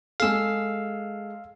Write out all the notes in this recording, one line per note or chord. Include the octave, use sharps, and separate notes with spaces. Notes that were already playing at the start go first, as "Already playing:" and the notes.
G#3 G#4 A4 F5 E6